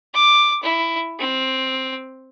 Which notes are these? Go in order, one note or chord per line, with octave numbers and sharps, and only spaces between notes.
D6
E4
C4